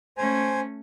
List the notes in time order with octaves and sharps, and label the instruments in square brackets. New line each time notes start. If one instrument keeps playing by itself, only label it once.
[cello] A3 C#4 [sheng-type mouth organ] C5 G#5